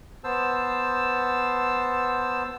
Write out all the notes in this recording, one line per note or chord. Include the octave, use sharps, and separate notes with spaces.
B3 C5 A5 E6